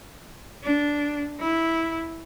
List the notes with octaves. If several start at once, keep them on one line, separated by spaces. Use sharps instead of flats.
D4
E4